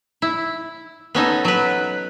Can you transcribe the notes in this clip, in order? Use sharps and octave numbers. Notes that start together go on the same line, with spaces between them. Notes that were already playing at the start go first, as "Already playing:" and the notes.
E4
B3 C#4 D#4 A4
F#3 B4